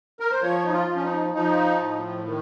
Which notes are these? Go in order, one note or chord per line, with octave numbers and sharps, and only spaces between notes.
A#4
C5
F3 C#5
D#4
F4
F3
C#4
D#4
F3 D#4
A2
D#3